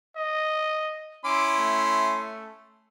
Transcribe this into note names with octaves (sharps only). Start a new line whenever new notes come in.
D#5
C#4 E4 C6 D6
A3